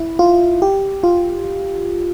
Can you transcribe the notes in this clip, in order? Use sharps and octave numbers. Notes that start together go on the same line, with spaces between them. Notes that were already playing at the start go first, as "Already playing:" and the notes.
Already playing: E4
F4
G4
F4